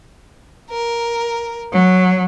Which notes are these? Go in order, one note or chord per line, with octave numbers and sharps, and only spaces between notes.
A#4
F#3